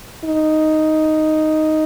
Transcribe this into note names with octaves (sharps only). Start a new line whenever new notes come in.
D#4